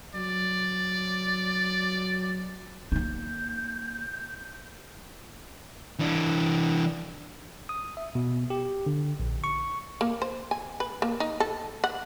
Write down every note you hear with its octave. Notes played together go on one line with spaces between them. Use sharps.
F#3 D5
A#3 D#4 G6
E3 D4
D#6
E5
B2
G4
D3
A#1
C#6
A#3
C5
G#5
B4
A#3
D#4
A4
F#5